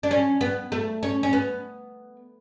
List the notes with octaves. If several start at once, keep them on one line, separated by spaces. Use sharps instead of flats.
D4
C#4
B3
A3
C#4
C#4
B3